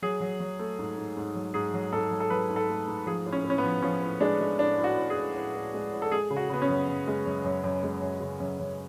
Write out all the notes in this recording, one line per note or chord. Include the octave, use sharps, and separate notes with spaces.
F#3 G#4
F#3
F#3
A3
G#2
G#2
G#2
F#3
G#2 G#4
F#3
G#2 A4
F#3
A4
F#3 B4
G#2
A4
A3
G#2
F3 G#4
A2
C#4
A2
C#4
B3
F3
F3 C#4
A2
G#3 D4
G#3
A2 D4
A2
F#4
A2
G#4
A2
A2
A2
G#3
A2
A4
G#3 G#4
C#3
F#4
C#3 B3
C#4
F#2
F#2
G#3
F#2
F#2
F#2
G#3
F#2
C#3
F#2
F#2